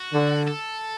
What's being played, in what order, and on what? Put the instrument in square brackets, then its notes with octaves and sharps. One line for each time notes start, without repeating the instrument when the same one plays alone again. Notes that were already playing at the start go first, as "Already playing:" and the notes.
Already playing: [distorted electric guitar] F#4
[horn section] D3
[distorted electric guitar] A4